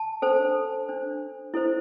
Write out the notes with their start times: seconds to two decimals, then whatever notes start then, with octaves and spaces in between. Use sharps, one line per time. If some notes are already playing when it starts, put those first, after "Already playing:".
Already playing: A5
0.22 D4 A4 C5
0.88 D4 C5
1.54 E4 A4 C5